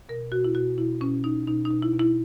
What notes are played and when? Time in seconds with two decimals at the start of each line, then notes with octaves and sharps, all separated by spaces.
0.09 B2 A#4
0.32 B2 F#4
0.45 E4
0.55 B2 F#4
0.78 B2 E4
1.01 B2 C#4
1.24 B2 D#4
1.47 B2 D#4
1.65 D#4
1.71 B2
1.82 E4
1.94 B2
1.99 E4